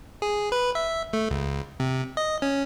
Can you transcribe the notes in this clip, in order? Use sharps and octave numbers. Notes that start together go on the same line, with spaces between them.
G#4
B4
E5
A3
C#2
C3
D#5
C#4